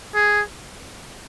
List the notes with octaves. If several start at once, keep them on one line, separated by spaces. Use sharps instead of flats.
G#4